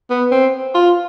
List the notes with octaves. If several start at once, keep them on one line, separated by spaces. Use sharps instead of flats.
B3
C4
F4